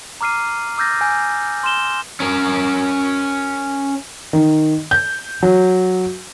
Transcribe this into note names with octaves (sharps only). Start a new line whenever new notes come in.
A#5 D6 F6 C7 D#7
D6 E6 F6 G6 A6 A#6
G#5 G6
C6 F6 E7 G7
C#4 A#4
D#3
G6
F#3